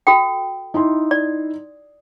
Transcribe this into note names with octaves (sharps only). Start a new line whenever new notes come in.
F#4 A4 G5
D#4 E4 C6
D5